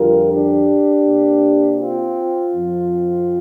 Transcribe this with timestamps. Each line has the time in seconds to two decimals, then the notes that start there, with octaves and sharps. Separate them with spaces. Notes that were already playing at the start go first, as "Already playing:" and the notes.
Already playing: F2 D3 G3 F4 A#4
0.30 D4 G4
1.05 C3 A#3
1.79 C4 F4
2.54 F2 F3 C4